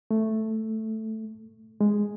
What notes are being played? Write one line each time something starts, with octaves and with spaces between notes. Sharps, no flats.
A3
G#3